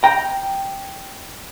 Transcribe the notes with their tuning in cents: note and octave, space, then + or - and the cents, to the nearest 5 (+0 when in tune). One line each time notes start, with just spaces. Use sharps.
G5 +0 A#5 +0